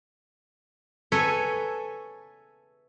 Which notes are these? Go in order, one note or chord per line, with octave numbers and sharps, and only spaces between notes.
A4 B4 C#5 E5 G#5 A#5